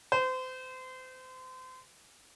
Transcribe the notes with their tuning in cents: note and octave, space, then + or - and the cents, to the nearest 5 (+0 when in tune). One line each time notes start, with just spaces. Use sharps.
C5 -30